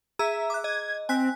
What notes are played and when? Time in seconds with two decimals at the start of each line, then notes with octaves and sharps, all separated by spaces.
0.19 G#4 E5 A#5 E6
0.50 D6 F#6
0.64 D#5 G#6
1.09 C4 G#5 F#6 B6